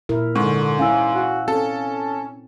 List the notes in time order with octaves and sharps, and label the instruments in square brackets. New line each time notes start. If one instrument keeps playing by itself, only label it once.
[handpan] A#2 E4 A#4
[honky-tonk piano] G#2 [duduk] D3 [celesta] C#6
[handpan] C#4 E4 [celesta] F5 G#5 E6
[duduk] F#4
[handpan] C4 [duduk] C#4 [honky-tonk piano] A4